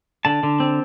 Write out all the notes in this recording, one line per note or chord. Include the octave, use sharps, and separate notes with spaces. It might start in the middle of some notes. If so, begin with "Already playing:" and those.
D3 A5
D3
C4